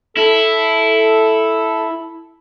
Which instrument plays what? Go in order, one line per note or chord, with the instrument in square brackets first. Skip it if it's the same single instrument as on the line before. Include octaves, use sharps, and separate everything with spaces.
[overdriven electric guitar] E4 [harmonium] A4